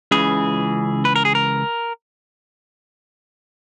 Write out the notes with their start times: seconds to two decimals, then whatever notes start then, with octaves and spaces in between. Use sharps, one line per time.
0.11 C#2 C#3 E3 G#4
1.05 B4
1.16 A#4
1.25 G#4
1.35 A#4